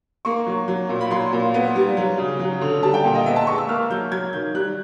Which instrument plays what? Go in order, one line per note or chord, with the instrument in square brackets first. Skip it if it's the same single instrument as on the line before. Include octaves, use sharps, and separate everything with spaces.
[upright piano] A#3 C#6
F#3
F#3
A#2
B5
F#3 C6
A#2
B3
G3
F#3
C#3
F#3
D3
G3 A5
G5
A#2
D#5
B3 E5
A5
G#3 C#6
E6
A#3 F6
F#3 G6
F#3 G#6
D#3 G6
G3 F#6